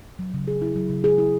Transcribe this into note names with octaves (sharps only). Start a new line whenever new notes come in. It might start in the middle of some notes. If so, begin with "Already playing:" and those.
F#3
C#3
G#4
E4
F#3
C#3
G#4
E4